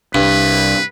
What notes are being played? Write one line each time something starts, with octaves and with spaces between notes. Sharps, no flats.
C2 G2 B4